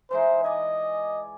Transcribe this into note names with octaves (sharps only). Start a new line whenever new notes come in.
E3 G#3 D#4 C5
D5 D#5 G#5